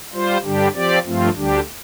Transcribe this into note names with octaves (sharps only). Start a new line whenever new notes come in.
G3 F4 C5
G2 D3 G3 D4 G4
F3 C4 G4 D5
G2 F3 A3 C4 F4
D2 D3 G3 D4 G4